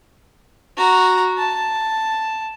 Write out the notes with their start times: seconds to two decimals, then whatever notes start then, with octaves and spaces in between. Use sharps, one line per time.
0.77 F#4 A#5
1.38 A5